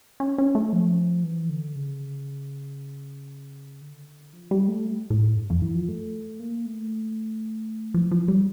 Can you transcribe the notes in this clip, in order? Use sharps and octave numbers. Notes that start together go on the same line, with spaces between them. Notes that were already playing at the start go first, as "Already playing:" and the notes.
C#4
C#4
A3
F3
E3
D3
C#3
D3
F3
G3
A3
A2
G2
F2
E3
F3
A3
A#3
A3
F3
F3
G3